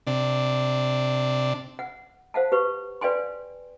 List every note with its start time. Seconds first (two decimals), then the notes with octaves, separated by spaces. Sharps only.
0.07 C3 D4
1.79 F#5
2.34 C5 F5 F#5 A5
2.52 G4 B4 C#6
3.01 B4 D5 F5 G5 G#5 C6